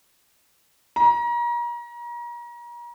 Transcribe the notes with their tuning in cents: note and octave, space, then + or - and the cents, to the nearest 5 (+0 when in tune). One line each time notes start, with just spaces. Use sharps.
A#5 +35